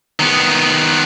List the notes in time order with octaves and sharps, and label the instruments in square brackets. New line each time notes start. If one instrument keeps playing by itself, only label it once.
[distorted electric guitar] D#3 B3